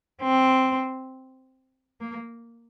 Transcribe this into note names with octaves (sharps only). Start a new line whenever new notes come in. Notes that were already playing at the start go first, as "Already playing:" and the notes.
C4
A#3